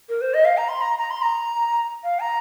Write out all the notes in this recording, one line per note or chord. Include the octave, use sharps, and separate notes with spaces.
A#4
C5
D#5
F5
A#5
C6
A#5
A#5
C6
A#5
F5
A#5